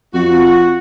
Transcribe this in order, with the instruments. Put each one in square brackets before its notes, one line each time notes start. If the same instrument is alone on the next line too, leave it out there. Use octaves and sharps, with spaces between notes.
[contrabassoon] F2 [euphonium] F4 [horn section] F#4